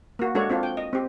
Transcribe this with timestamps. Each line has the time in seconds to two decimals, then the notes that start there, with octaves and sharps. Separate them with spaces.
0.19 A#3 F#4
0.35 G#3 D4 F#4 A4 C#5
0.50 C4 D4 F4
0.63 G5
0.77 D#5
0.93 C4 G4